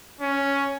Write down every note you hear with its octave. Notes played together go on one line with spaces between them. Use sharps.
C#4